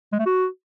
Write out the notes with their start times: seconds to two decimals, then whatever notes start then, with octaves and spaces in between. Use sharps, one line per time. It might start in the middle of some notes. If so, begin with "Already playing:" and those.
0.13 G#3
0.19 A3
0.26 F#4